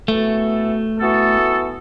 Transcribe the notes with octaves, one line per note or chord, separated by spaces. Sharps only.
E3 A3 B3 F#4 A4
E3 B3 F#4 A4